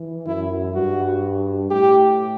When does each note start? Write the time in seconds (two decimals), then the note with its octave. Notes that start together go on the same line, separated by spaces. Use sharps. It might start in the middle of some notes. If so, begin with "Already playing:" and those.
Already playing: E3
0.27 F#2 E4
0.74 G2 F#4
1.70 A2 G4